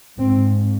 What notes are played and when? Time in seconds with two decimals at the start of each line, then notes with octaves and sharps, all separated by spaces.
0.18 G#2 C4